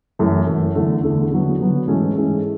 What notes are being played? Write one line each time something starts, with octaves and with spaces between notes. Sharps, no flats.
F#2 E3 A3
F#2 E3 A3
E2 D3 A3
E2 D3 A3
D3 F#3 B3
D3 F#3 B3
G#2 E3 A3 C#4 G#4
G#2 E3 A3 C#4 G#4